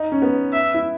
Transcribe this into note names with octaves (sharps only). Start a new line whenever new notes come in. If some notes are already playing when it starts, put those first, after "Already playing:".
Already playing: D#4
C#4
B3
E5
E4